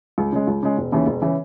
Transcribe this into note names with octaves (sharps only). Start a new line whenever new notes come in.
C#2
C#3 G#3
C#2
C#3 G#3
E1
D#2 C#3 E3
E1
C#3 E3